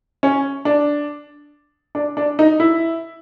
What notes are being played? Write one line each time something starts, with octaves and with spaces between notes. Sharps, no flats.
C#4
D4
D4
D4
D#4
E4